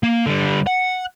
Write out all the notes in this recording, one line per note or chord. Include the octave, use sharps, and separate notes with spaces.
A#3
D3 G3
F#5